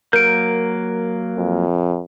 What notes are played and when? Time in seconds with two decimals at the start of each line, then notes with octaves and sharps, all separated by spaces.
0.13 F#3 A#3 A#4 G6 D7
1.37 F2